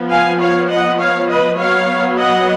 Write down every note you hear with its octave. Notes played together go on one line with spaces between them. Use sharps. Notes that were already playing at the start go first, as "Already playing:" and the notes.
Already playing: F3 B3
F5 G#5
C#5 F5
D#5 F#5
C#5 F5
B4 D#5
F#3 B3 C#5 F5
D#5 F#5